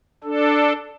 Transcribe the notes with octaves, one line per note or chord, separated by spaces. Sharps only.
D4 A4